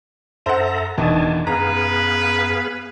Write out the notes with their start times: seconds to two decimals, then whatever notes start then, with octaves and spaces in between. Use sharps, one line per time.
0.46 F#2 A4 C5 E5 F#5 A#5
0.98 F1 E2 B2 D#3 D4 G#5 A5
1.47 F#2 B3 G#4 B4 F5 A#5